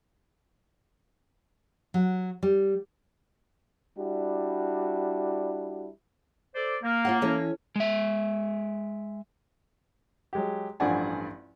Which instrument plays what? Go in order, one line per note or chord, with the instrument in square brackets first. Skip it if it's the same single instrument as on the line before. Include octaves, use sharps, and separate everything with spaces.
[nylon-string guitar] F#3
G3
[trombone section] G3 D4 E4 F#4
[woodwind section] A4 C5 D5
A#3
[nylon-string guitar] F4 C#5 F#5
E3 C#4 A4
[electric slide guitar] G#3 E5
[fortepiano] F#3 G#3 G4
A1 G2 F3 D5 F#5 G#5